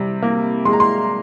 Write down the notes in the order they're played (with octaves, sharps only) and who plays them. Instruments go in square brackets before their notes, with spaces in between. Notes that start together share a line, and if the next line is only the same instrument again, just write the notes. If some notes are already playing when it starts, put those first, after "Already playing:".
Already playing: [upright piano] C3 G3
A#3
G#3 C6
A#5
C6